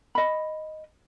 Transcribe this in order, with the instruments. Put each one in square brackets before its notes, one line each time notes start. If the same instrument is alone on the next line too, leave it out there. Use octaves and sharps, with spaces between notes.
[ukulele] D#5 B5